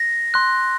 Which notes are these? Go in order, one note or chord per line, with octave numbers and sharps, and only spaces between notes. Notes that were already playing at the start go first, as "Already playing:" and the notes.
Already playing: A#6
C6 F#6